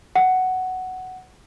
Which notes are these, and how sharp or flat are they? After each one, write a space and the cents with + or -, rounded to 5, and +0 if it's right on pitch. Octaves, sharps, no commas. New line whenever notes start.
F#5 +5